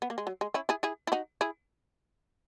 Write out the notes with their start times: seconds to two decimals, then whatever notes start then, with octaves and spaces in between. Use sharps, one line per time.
0.02 B3
0.10 A#3
0.18 G#3
0.27 F#3
0.41 G#3
0.54 C#4 E4
0.69 E4 G#4
0.83 E4 G#4
1.07 E4
1.12 D#4 F#4
1.41 E4 G#4